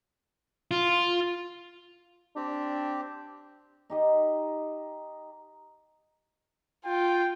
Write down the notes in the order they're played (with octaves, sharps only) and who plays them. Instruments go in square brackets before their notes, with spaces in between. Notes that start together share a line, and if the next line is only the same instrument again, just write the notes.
[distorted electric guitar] F4
[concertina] C4 G4 [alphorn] D4
[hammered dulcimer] D#4 G4 D#5
[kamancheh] F4 [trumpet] G5